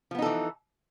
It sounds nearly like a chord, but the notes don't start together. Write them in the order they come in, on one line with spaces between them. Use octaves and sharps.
F3 B3 D#4 A4 E3